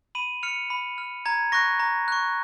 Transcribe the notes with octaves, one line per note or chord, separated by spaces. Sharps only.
B5 D#7 F#7
F6 C#7 F7
B5
F6
A#5 G#6
C#6 F#6 A#6
A#5
C#6 F#6